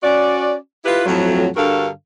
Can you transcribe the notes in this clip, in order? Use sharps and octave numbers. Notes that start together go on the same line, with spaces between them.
C#4 F#4 D5
E4 F4 G4 B4
F2 A2 F#3
G2 D3 F#4 A4 A#4 F5